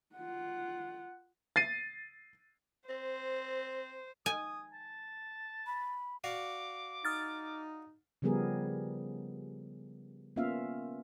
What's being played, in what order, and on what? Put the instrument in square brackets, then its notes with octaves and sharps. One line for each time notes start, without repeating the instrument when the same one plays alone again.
[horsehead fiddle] F4 F#5
[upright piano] A6 C7 D#7
[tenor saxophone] C4 [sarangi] C5
[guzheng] G#5 [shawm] D#6
[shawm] A5
[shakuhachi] B5
[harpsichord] F#4 D5 F5 [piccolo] D6
[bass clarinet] D#4 [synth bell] D#6 F6 A6
[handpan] C#3 F3 G3 B3 G#4 A#4
A#3 B3 C#4 F4 E5 F5